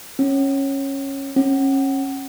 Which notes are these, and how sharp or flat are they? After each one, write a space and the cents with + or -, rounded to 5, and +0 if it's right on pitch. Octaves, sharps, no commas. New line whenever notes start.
C#4 -15
C#4 -30